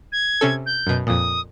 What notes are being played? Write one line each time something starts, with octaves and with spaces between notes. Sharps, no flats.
G#6
C3 C#4 A4
G6
F#2 B2
F2 A#2 D#6